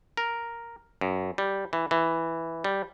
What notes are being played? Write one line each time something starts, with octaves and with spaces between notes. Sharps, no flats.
A#4
F#2
G3
E3
E3
G3